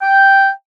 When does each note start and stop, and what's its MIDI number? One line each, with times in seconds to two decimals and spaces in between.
0.02 0.49 79